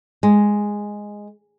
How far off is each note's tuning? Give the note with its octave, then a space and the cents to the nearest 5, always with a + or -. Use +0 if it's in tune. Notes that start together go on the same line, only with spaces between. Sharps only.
G#3 -5